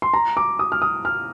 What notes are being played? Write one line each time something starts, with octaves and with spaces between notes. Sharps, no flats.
C6
A#5
D6
D#6
F6
D#6
F6